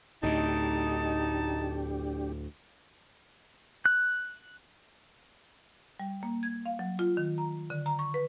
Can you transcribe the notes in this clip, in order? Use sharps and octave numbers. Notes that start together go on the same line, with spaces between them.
D2 A2 D4 D#4 G4 A5
F#6
G3
A#3
G#6
F5
F#3
F4
D#3
A#5
D3
A#5
C#6
B4